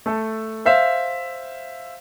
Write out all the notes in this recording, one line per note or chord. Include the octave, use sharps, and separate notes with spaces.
A3 A4
C5 E5 F5